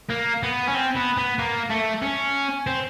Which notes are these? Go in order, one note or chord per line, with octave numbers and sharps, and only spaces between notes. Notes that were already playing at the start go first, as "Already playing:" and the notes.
A#3
B3
C#4
C4
B3
B3
A#3
A3
C#4
C4